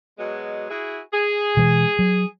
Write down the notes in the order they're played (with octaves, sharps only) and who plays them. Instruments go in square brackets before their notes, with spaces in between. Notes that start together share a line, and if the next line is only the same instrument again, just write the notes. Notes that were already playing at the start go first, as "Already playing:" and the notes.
[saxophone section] B2 F#3 G#3
E4 F#4 G#4
G#4
[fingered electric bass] B2 E3 G#3
F#3